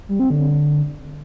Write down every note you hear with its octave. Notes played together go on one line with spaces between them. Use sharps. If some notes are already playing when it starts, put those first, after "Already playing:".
G3
C4
D3